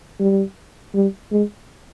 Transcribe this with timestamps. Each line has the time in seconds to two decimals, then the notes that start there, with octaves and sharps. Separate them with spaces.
0.20 G3
0.95 G3
1.32 G#3